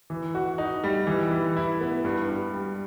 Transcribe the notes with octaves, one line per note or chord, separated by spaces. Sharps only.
E3
F#4
D#4
G3
E3
E3
E4
B3
G2
G2
G3